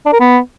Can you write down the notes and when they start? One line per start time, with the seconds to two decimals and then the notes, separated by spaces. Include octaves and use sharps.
0.06 D4
0.13 A#4
0.20 B3